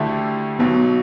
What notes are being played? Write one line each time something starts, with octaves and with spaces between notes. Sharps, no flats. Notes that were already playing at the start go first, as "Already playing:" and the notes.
Already playing: D2 D3 A3 E4 G4
B1 B2 F#3 B3